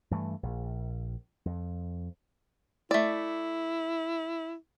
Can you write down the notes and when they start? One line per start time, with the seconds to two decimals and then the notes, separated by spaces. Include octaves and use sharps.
0.11 G2 E3 A3
0.43 A#1
1.46 F2
2.91 A3 E4 D5